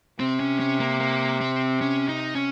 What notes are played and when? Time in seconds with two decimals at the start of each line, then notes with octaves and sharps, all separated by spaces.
0.19 C3 C4
0.40 C#4
0.60 C#4
0.80 A#3
1.00 A#3
1.41 C4
1.81 C#4
2.09 D#4
2.35 C#4